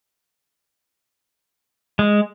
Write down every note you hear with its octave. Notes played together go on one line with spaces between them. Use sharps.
G#3